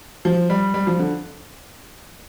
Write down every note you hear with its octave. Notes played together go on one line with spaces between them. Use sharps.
F3
G3
G3
F3
D3